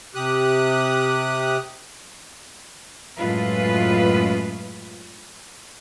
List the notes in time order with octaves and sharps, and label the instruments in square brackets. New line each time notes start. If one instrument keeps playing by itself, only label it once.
[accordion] C3 G4 D#6 F#6
[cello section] F#2 A2 G#3 F4 B4